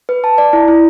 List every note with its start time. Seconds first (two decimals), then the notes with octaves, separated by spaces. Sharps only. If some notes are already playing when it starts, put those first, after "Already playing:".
0.09 B4
0.24 A5
0.38 D5
0.53 E4
0.68 E4